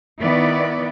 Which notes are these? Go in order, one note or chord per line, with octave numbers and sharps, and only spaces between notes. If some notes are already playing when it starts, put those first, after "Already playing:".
D#3 B3 E4 D5